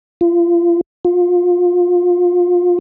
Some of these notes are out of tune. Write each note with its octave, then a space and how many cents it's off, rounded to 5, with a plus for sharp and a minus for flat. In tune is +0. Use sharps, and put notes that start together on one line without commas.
F4 -30
F4 +25